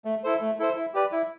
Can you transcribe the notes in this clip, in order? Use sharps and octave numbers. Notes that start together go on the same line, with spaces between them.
A3
E4 A4 C5
A3
E4 A4 C5
E4
G4 B4 D5
E4